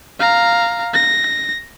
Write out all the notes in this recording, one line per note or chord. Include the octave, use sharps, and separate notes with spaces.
F5 A#5
A#6